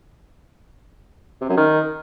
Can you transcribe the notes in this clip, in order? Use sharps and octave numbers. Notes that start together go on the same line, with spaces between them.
C3
F#2
D#3